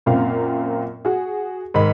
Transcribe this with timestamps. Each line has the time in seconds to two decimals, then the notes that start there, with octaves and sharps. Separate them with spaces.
0.06 F#2 A#2 C4 F5
1.05 F#4 G#4
1.74 G#2 D#3 B5